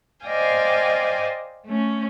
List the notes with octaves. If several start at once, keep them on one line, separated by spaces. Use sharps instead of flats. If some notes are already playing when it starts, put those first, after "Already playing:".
C5 D5 D#5 F5 G5 G#5
A3 C#4